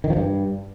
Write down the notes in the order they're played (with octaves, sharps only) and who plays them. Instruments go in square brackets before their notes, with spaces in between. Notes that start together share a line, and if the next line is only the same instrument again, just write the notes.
[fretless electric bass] D#3
F3
G2